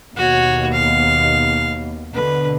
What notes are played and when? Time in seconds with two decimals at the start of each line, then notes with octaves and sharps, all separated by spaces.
0.16 D#2 B2 F#4 C#5
0.72 F5
2.13 B2 D3 B4